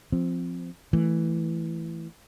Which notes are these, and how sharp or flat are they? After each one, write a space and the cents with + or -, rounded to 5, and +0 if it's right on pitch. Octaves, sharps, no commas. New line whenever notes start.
F3 +0 C4 -5
E3 +0 A3 +0